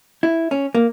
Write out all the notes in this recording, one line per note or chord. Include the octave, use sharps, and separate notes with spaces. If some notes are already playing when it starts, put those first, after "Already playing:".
E4
C#4
A#3